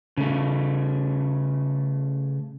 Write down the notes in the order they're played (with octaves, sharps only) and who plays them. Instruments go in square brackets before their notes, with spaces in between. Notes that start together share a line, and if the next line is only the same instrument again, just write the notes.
[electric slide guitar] C#3 A3